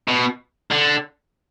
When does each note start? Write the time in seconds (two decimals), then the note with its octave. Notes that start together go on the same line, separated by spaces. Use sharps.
0.08 B2
0.71 D3